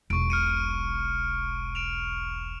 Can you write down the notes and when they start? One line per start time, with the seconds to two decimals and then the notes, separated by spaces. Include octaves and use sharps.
0.10 E1 B1 C#6 D7
0.30 F6 C#7 D#7
1.75 D7 E7 F7